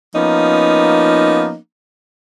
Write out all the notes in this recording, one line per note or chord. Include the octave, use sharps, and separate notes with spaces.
F3 A#3 B3 C#4 D#4